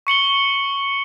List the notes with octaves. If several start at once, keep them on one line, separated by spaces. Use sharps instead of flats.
C#6 C#7 F#7 G7